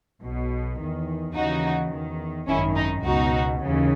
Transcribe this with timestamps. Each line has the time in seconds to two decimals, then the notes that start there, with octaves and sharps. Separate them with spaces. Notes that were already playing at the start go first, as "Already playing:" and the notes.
0.22 B1 B2
0.79 E2 D#3
1.35 D#2 C#3 E3 D#4 F#4
1.92 E2 D#3
2.48 G#1 F#2 D#3 C#4 E4
2.76 D#4
3.04 C#2 B2 D#4 F#4
3.61 D#2 C#3 E3